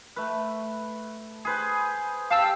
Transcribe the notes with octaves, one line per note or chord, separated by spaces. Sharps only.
A3 B4
G#4 B4 C5
G4 F5 A5 E6